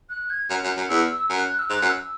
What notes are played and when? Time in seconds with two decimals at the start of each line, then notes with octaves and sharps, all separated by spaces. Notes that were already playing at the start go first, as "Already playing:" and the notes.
0.10 F#6
0.30 G#6
0.50 F#2
0.64 F#2
0.77 F#2
0.89 E2 E6
1.30 F#2
1.39 F#6
1.49 F#6
1.59 E6
1.68 G#2 F#6
1.82 F#2
1.89 E6